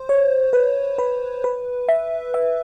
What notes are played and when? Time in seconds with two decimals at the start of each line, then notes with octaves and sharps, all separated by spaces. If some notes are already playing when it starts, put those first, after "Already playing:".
Already playing: C5
0.09 C#5
0.53 B4
0.98 B4
1.44 B4
1.88 E5
2.34 E5